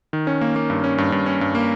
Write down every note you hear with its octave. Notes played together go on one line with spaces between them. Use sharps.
D#3
C#4
A#3
A#3
G2
C#4
G2
G2
C#4
G2
A#3